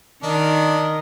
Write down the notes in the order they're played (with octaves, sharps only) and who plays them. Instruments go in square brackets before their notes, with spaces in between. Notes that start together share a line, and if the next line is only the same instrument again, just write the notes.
[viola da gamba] D#3 [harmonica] D4 [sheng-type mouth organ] A#4 D#5